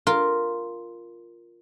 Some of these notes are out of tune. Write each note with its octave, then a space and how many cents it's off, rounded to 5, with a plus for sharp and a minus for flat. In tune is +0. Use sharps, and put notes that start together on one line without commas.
F4 +0 A#4 +0